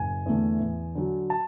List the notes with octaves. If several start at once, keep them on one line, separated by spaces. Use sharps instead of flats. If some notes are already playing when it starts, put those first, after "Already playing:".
Already playing: F#1 G#5
E2 D3 A3
E2
D3 F#3
A5